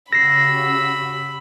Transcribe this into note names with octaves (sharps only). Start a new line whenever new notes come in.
C#3 F#4 G4 B5 E6 A#6 C7